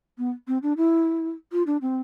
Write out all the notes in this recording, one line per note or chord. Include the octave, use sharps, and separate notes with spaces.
B3
C4
D4
E4
F4
D4
C4